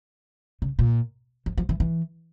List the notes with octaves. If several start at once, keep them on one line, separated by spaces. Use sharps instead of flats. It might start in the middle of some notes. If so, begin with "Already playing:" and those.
C#3
A#2
F3
F3
E3
E3